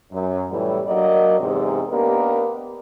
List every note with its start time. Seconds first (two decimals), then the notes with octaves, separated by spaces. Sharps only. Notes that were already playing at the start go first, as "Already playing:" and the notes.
0.12 F#2
0.50 A2 E3 G3
0.86 F#3 A#3 D4 A#4 D5 D#5
1.39 E2 G#2 C3
1.89 A#3 B3 D4 D#4 G4 A#4